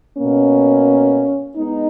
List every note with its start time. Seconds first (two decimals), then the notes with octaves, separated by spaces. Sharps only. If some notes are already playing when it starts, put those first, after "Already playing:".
0.18 B2 A#3 C#4
1.56 G#3 B3 D#4